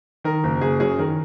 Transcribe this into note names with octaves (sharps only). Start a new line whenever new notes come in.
D#3 A#4
F#1
F#1 G#4
F#2 G#4
D#3 A#4